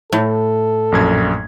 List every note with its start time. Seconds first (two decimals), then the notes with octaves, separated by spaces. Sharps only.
0.12 A2 A4
0.92 A#1 F#2 G#6